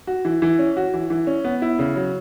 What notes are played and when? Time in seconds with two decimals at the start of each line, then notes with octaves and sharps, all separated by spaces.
0.07 F#4
0.25 E3
0.42 E3
0.59 C#4
0.77 F#4
0.94 E3
1.10 E3
1.27 C#4
1.45 B3
1.62 E4
1.79 C#3
1.96 F#3